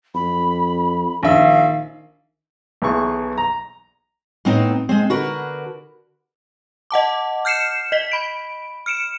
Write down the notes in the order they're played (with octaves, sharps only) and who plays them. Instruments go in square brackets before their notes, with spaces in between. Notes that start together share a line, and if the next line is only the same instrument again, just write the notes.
[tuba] F2 [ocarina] B5
[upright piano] A#1 E5 [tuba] D#3 [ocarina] F5
[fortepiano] B1 E3 G#4 C#6
A#5
[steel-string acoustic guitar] A2 B3 C4 D#4
G#3 C4
D3 F#4 A#4 B4
[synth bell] D#5 F#5 A5 D6
F6 G6 C7 C#7 E7
D#5 B6 G7
B5 D7
F6 C#7 D7 E7